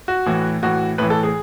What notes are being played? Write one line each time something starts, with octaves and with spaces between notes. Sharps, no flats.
F#4
A2 E3
A2 E3 F#4
A2 E3 B4
A4
G#4